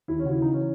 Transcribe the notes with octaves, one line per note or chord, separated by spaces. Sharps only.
D#2 E4
C#4
C#3 F#4
E4
E3 D#4
E3 C#4